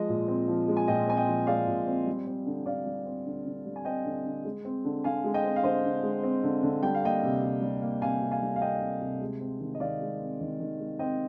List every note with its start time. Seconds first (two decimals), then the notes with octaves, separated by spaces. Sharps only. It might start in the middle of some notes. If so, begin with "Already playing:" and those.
Already playing: F3 G#3 D#5
0.09 A#2
0.28 C4
0.48 F3
0.68 G#3
0.77 G#5
0.88 A#2 D#5 G5
1.07 C4 G#5
1.17 D#5 G5
1.27 F3
1.47 G#3 D5 F5
1.67 A#2
1.87 C4
2.06 G3
2.27 C4
2.46 D3
2.66 D3 D5 F5
2.86 G3
3.05 C4
3.26 D3
3.46 D3
3.66 G3
3.76 G#5
3.85 C4 D#5 G5
4.05 D3
4.25 D3
4.45 G#3
4.65 C4
4.85 D3
5.04 D3 F5 G#5
5.24 G#3
5.34 D#5 G5
5.44 C4
5.56 F5
5.63 D3 C5 D#5
5.84 D3
6.03 G#3
6.23 C4
6.43 D3
6.63 D3
6.83 G3 G5
6.95 F5
7.03 A#3 D#5 G5
7.23 C3
7.42 C3
7.62 G3
7.81 A#3
8.02 C3 F5 G#5
8.22 C3
8.31 F5 G#5
8.42 G3
8.56 F5
8.61 A#3 D#5 G5
8.81 C3
9.01 C3
9.21 G#3
9.41 C4
9.60 D#3
9.74 D#5
9.80 D#3 D5 F5
10.01 G#3
10.20 C4
10.40 D#3
10.60 D#3
10.79 G#3
10.99 C4 D#5 G5